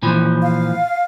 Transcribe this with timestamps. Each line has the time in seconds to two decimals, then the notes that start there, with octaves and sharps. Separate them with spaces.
0.02 A#2 E3 F3
0.42 F5